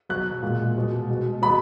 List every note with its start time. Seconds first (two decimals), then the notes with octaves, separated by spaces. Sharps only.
0.09 B2 F#3 F#6
0.43 A#2 G#3
0.76 B2 G#3
1.09 B2 G#3
1.42 B2 G#3 B5